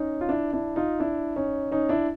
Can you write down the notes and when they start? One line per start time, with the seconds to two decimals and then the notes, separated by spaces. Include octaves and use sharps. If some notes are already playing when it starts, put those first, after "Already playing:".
Already playing: C#4 D#4
0.21 F4
0.29 D4 E4
0.53 D4 E4
0.76 D#4 F4
1.00 D4 E4
1.36 C#4 D#4
1.72 C#4 D#4
1.89 D4 E4